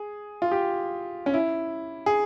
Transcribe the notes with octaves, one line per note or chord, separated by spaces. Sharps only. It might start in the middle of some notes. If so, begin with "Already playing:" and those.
Already playing: G#4
F4
G4
C#4
E4
G#4